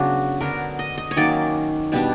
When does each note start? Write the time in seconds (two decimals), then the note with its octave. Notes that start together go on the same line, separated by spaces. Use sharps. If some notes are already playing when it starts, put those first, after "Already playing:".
Already playing: C#3 F#3 B3 D4 F#4
0.41 D3 F#3 B3 D4 A#4
0.79 D#5
0.98 D#5
1.11 C#5
1.17 D#3 F#3 A#3 C#4 D5
1.92 B2 G3 B3 D4